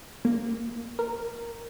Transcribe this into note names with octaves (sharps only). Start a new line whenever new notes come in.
A#3
A#4